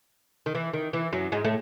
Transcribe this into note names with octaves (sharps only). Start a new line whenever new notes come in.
D#3
E3
D#3
E3
F#2 F#3
G#2 G#3
A2 A3